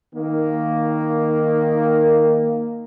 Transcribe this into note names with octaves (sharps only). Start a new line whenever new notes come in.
D#3 A#3